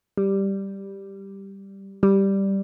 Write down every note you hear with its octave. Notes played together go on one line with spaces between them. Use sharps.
G3
G3